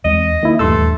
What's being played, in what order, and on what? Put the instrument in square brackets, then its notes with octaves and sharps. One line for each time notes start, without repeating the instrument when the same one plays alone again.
[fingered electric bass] E2 G#3 C4 [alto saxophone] D#5
[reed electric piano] D#3 E4 [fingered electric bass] A#3
[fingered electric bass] D#1 E2 [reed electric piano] G2 C6 E6 [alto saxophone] A3